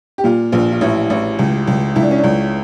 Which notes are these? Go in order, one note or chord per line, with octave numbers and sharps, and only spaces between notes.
G4
A#2 F4
A#1 F4
F4
A1 E4
A1
C#2
C#2
C#2 E4
D4
C#4
D4
C#2